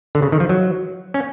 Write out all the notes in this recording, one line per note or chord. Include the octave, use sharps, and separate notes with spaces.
D3
C#3
D#3
F3
F#3
C#4